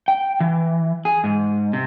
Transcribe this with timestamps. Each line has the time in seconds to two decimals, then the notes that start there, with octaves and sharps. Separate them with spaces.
0.08 G5
0.40 E3
1.05 G#4
1.24 G#2
1.73 C3